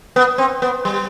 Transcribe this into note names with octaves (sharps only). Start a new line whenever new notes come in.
B3
C4
B3
G3